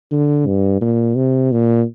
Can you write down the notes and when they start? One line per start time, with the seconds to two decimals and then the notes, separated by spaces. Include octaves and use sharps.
0.11 D3
0.47 G2
0.81 A#2
1.16 C3
1.52 A#2